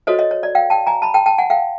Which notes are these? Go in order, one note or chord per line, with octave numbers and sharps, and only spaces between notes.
F#4 A4 C5 C#5 D#5
C#5 D#5
C#5
D5
F5 G5
G5 A5
G#5 A#5
A5 B5
G5 A5
G5 A5
F#5 G#5
F5 G5